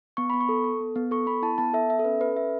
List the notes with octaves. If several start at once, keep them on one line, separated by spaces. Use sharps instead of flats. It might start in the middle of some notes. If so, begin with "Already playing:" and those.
B3 C#6
B3 B5
C#6
A4
A4
B3
B3
A4 C#6
B3 B5
E4 A5
B3 A5
A4 E5
B3 E5
A4
C#4 B4
C#4 B4
A4 E5